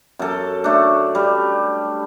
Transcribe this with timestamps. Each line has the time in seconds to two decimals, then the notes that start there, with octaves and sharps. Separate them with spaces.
0.19 F#2 A4
0.64 A3 D4
1.15 G3